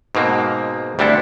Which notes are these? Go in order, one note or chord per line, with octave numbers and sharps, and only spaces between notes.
G#2 B2 A#3 C4
D2 G3 C4 D4 E4 A4